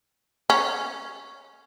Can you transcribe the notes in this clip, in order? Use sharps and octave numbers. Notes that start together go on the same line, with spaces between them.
C#4